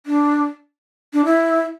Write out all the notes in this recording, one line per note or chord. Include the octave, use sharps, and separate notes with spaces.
D4
D4
E4